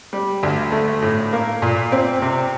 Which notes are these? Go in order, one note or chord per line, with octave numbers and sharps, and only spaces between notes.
G3
D2
A3
A2
A#3
A#2
C4
C3